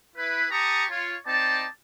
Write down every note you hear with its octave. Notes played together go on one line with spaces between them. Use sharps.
E4 B4
G4 A5 A#5 C#6 D#6
F4 C#5
C4 D#4 D5 A5